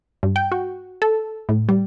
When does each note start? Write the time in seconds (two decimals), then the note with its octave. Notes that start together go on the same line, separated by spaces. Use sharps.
0.23 G2
0.36 G5
0.52 F#4
1.02 A4
1.49 A2
1.69 G3